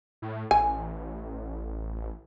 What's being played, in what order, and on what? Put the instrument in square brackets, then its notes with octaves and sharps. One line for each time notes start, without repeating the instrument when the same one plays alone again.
[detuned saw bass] A2
[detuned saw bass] A1 [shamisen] G#5